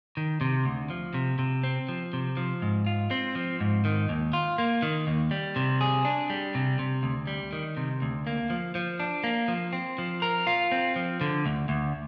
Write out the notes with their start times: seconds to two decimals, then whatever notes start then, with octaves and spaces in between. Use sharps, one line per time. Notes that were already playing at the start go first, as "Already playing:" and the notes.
0.17 D#3
0.41 C3
0.65 D2
0.90 F3
1.14 C3
1.39 C3
1.63 C4
1.89 F3
2.13 C3
2.37 F3
2.62 G#2
2.86 F4
3.11 C4
3.35 F3
3.60 G#2
3.85 D#3
4.09 D#2
4.33 F4
4.58 A#3
4.82 D#3
5.07 D#2
5.31 G3
5.56 C3
5.81 G#4
6.05 D4
6.30 G3
6.55 C3
6.79 C3
7.03 D2
7.27 G3
7.53 D#3
7.77 C3
8.02 D2
8.27 A#3
8.50 F3
8.75 F3
9.00 D4
9.24 A#3
9.48 F3
9.73 C4
9.98 F3
10.22 A#4
10.47 F4
10.72 C4
10.96 F3
11.21 D3
11.46 D2
11.69 D2